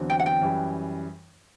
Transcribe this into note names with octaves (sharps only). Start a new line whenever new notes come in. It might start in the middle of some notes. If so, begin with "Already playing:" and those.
Already playing: E2 D3 F#3 C4
G5
F#5
G5
F#2 E3 G3